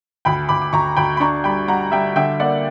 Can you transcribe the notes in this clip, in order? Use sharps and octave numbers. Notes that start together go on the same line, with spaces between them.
D2 G5 B5
D2 B5 D6
D6
D2 A#5 C#6
D2 G5 B5
B5
D4 A#5 C#6
G3 G5 B5
G3 F#5 A#5
G3 E5 G5
D3 E5 G5
A#3 D5 F#5